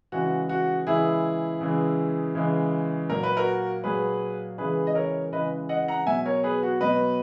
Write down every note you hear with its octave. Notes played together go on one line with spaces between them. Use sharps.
C#3 E3 G#3 F#4
F#4
C#3 E3 G#3 E4 G#4
C#3 E3 G#3
C#3 E3 G#3
A#2 F#3 A#4
B4
F#4 A#4
A#2 F#3 G#4 B4
C#3 E3 G#3 G#4 B4
D#5
A#4 C#5
C#3 E3 G#3 B4 D#5
D#5 F#5
F#5 A#5
B2 F#3 E5 G#5
A#4 C#5
G#4 B4
F#4
B2 F#3 B4 D#5